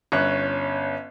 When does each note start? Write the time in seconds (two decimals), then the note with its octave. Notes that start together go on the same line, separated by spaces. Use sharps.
0.12 G1 C#4 F#6